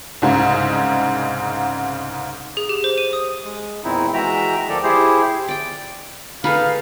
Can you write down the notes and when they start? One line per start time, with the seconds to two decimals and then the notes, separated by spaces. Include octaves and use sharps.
0.22 C2 G#2 C#3
2.57 G#4
2.69 G4
2.84 C5
2.98 D#7
3.13 D#6
3.44 G#3
3.84 E2 A#2 D#3 C4 D#4 E4
4.14 E3 G#3 F#4 E5 G5 A#5
4.69 D2 D#3 F3 A4 D5
4.83 E4 G4 G#4 C5
5.49 D5 G5
6.44 D#4 G#4 A4 B4 F5